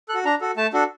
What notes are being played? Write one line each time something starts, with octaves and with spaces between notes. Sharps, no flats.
A4 F#6
F#4
D4 A#5
F#4 A4
A3 A5
D4 F#4 A4